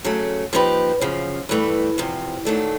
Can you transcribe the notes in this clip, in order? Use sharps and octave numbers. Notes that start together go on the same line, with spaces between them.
C#3 F#3 A3
F3 A#3 D#4 G4 B4
F#2 C#3 F3
G2 E3 A3
E2 C3 F3
G#2 D#3 F#3 A3 D4